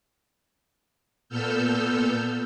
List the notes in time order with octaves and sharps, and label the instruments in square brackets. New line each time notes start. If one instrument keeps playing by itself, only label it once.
[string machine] A#2 B3 A4 E6 F6 G6